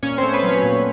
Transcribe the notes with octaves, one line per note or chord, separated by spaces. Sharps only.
A#2 C#4 C#5
A3 C4 C5
B3 B4
F#3
C#4 C#5
A#2